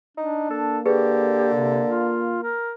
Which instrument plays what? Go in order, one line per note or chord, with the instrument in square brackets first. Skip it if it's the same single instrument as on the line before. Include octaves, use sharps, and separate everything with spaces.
[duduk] D4 [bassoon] D#4
[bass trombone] A#3 [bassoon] A4
[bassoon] D3 [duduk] G4 [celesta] G#4 B4
[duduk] C3
F4
A#4